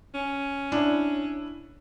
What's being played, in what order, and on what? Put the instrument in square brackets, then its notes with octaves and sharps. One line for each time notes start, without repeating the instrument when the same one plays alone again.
[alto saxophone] C#4
[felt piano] D4 E4